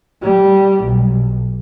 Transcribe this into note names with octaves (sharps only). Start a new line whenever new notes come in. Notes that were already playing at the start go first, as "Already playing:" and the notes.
G3
B1